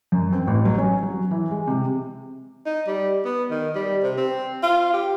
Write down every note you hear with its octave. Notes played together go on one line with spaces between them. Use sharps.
F#2
C4
A1
F#3
C#4
F#3
E3
G#3
C3
D#4
G3
B3
D#3
G3
C3
C4
F4
G4